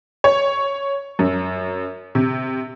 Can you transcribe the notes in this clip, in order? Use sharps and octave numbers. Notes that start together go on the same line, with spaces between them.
C#5
F#2
C3